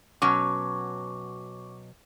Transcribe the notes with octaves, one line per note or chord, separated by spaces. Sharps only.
B2 F#3 C#4 C#6 D6